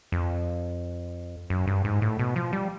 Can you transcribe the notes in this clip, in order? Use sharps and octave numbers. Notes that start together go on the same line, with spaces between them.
F2
F#2
G2
G#2
A2
B2
F3
G3